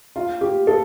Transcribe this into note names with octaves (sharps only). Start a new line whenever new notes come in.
F4
G4
A4